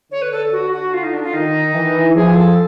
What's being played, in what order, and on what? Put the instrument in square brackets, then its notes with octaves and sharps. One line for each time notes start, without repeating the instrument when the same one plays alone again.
[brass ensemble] D3 [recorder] C#5
[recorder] B4
A4
F#4
F#4
F4
D#4
D4
F4
[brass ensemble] D#3 [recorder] D#4
[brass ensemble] E3
[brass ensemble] F3 [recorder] G#4
[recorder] A4